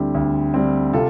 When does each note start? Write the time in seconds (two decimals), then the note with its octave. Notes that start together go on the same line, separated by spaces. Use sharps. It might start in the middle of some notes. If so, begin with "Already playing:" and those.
Already playing: D2 D3 G3 C4 E4 G4
0.14 D2
0.54 D3 G3 C4
0.93 C3 F4 A4